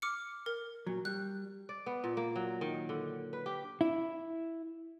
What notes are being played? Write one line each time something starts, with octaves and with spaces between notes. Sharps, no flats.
D6 F6 C#7
A#4
A#2 F#3
G3 F#6
D5
B3
A#2
A#3
F#3
D#3
D3
B4
G4
E4